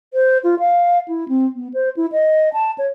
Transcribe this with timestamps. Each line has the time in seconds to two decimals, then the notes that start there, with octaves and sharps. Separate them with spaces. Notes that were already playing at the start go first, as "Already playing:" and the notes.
0.14 C5
0.44 F4
0.59 F5
1.08 E4
1.28 C4
1.56 B3
1.74 C5
1.97 E4
2.12 D#5
2.53 A5
2.78 C#5